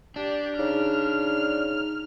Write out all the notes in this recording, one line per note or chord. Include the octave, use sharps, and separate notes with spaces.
D4 G4 D5
C#3 D#4 F6